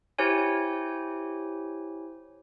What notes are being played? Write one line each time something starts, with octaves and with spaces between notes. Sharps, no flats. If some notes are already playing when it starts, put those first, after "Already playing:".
E4 G4 C5 C#5 G#5